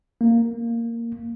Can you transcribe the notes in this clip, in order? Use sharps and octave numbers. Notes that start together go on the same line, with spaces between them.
A#3